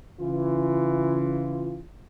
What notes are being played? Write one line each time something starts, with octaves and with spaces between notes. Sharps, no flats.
C#3 E3 F4